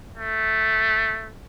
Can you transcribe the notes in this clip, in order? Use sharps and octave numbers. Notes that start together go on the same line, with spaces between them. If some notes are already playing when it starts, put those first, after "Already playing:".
A3